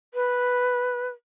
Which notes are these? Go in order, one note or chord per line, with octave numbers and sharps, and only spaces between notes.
B4